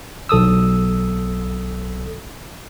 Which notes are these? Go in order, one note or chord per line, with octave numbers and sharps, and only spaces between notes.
B1 A4 D#6 E6